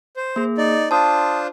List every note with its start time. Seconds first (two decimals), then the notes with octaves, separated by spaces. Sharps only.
0.17 C5
0.36 A#3 G#4
0.58 D#4 D5
0.91 D4 F4 C5 A5 D#6